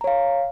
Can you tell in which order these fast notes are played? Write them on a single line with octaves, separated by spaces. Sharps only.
A#5 C#5 F5